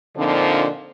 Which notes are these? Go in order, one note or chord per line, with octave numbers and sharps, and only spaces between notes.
A#2 D3 F3 C4 D4 D#4